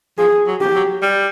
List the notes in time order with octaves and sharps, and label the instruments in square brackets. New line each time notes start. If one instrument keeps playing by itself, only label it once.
[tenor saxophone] F3 [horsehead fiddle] G#4
[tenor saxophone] F#3
[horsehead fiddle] G4
[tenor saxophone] F#3
G3